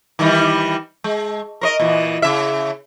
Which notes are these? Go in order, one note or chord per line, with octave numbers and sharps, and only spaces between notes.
D#3 E3 G3
G#3
A#4 C5 D#5
A#2 E3
C#3 E5